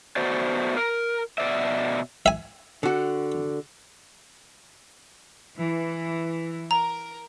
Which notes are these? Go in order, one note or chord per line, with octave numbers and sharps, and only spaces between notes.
A3 B3 F#4 C5 D5
A#4
B2 D5 E5
E5 G#5
D3 F#4
E3
A#4 A#5